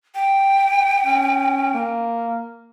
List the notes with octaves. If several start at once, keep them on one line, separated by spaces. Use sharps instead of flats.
G5
C#4
A#3